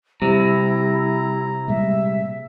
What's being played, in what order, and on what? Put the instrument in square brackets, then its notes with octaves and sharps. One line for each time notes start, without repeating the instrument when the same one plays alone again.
[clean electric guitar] C3 [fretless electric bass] G3 [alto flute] E4 [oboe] A#5
[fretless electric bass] A#2 G3 G#3 [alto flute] E5